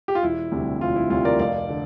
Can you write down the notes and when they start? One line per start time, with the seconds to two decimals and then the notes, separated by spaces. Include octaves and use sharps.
0.08 G4
0.15 F4
0.23 E1 E4
0.51 D2 C3 G3
0.81 E1 F4
0.96 E4
1.10 D2 C3 G3 F4
1.25 A#4 D5
1.39 F1 D5 F5
1.69 D3